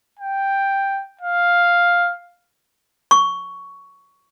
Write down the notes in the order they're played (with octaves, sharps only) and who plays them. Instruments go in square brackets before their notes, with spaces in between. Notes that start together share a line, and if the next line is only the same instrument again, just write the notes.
[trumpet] G5
F5
[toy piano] C#6